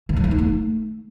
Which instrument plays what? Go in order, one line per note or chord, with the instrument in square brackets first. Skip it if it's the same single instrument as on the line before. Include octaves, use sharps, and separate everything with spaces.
[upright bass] E3
F#3
B3
D#4
A3